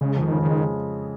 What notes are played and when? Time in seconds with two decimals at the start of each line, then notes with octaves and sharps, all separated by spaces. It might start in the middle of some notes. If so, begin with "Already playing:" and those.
0.01 C#3 G#3
0.16 F2
0.22 D#3
0.32 C#3
0.42 D#3
0.48 G#3